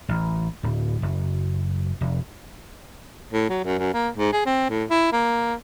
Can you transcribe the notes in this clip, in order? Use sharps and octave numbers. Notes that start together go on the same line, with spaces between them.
A1
D1
F#1
F1
A2
F#3
F#2
F#2
A#3
G#2
G#4
C4
A2
E4
A#3